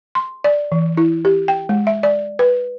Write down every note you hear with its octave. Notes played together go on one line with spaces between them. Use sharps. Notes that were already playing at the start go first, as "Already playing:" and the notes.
C6
D5
E3
E4
G4
G5
G#3
E5
D5
B4